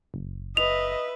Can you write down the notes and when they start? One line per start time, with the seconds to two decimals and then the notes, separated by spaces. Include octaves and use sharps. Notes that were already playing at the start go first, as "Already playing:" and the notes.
0.14 F#1
0.57 B4 D#5 E5 F7